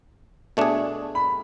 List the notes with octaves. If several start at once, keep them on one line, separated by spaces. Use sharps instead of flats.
B2 A3 D4 G#4
B5